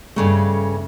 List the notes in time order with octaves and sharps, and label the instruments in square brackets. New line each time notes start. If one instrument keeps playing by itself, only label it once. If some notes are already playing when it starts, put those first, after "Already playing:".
[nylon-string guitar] G2 C#3 A3